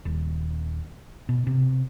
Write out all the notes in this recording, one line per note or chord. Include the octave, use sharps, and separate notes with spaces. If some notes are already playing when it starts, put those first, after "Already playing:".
D#1
B2
C3